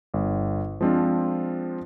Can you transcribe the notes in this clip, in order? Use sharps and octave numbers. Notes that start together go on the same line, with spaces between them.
G1
F3 G#3 C4 D4 F4